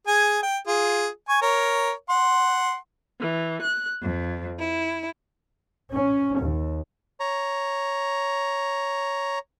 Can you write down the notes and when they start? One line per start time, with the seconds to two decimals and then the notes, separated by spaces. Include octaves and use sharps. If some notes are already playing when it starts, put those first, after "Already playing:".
0.07 G#4 G#5
0.43 G5
0.67 F4 G#4
1.29 G#5 C#6
1.42 A#4 C#5
2.09 F#5 C6
3.21 E3
3.62 F#6
4.02 F2
4.59 E4
5.95 C#4
6.40 D#2
7.20 C#5 A#5